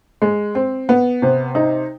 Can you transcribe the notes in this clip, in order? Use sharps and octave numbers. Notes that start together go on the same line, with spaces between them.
G#3
C4
B3
C3
D#4